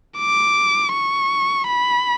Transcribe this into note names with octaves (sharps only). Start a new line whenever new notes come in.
D6
C#6
B5